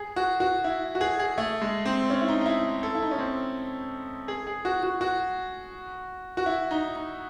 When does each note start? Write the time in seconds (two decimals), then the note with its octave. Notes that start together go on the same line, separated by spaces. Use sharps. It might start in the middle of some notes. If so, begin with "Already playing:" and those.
Already playing: G#4
0.16 F#4
0.40 F#4
0.64 E4
0.95 F#4
1.01 G#4
1.19 G#4
1.38 A3
1.62 G#3
1.85 C4
2.10 C#4
2.21 E4
2.28 D#4
2.41 D#4
2.46 E4
2.83 A4
2.95 E4
3.02 D#4
3.11 C#4
3.19 C4
4.28 G#4
4.47 G#4
4.65 F#4
4.83 F#4
5.01 F#4
6.37 F#4
6.46 E4
6.71 D#4
6.96 D#4